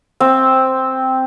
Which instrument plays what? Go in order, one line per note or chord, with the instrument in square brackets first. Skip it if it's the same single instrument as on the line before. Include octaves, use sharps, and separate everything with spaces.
[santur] C4